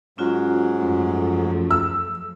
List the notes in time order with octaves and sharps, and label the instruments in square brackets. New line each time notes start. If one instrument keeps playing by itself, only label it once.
[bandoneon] G#2 F#3 G#3 [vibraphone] C#4 F4 F#4
[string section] F#2 F3 A3
[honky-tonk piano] E6